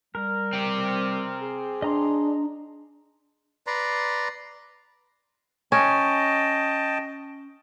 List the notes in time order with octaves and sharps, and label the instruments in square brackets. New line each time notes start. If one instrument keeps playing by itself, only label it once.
[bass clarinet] G3 [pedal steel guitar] A#4
[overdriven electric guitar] C4 G4
[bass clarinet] G#4
[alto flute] D4 [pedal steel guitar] D#5 A#5 C6
[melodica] B4 D5 A#5 C6
[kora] C#4 [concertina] D#5 G5 A5